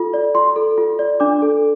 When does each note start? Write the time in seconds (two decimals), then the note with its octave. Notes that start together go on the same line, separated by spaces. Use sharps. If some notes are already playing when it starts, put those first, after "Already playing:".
Already playing: F4 A4
0.14 D5
0.35 F4 C6
0.56 A4
0.78 F4
0.99 D5
1.20 D4 D6
1.42 A4